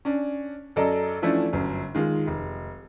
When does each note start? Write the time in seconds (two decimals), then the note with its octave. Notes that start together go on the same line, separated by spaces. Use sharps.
0.05 C#4 D4
0.76 F#2 A4 D5 D#5 A#5
1.22 E3 F3 A3 C#4 D4 E4
1.53 G1 F#2
1.95 D#3 G#3 F4
2.27 F1